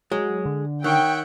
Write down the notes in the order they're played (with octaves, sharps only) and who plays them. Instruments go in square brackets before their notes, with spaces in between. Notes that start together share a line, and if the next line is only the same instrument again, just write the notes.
[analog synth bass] F#3 [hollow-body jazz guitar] G#3
[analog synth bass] D3
[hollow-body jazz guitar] D#3 [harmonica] C#5 E5 F#5 [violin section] G5